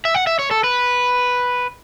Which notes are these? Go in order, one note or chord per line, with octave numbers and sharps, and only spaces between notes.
E5
F#5
E5
C#5
A4
B4